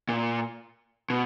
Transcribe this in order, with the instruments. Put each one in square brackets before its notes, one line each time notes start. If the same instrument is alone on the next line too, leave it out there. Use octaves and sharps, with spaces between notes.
[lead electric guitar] A#2
B2